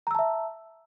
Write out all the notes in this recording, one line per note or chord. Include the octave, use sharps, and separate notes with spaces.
E5 A5 A#5 E6